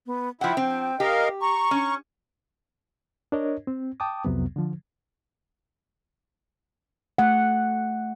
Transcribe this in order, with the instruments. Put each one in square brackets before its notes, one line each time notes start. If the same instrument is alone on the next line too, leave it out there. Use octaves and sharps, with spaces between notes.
[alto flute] B3
[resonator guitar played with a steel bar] F3 F#5 [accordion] E4 E5 [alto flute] G5
[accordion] F3 [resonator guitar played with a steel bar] C4
[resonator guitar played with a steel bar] G4 [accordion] A#4 D#5 F5
[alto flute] A#5 [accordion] C#6
[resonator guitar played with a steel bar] C#4
[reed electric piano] D4 A#4 C#5 D#5
C4
G5 A5 D6 D#6
C2 F2 C3 F#3 B3
D3 F3
[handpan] A3 F#5